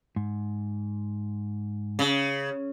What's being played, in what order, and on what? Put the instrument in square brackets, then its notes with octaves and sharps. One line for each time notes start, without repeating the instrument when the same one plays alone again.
[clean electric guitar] G#2
[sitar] C#3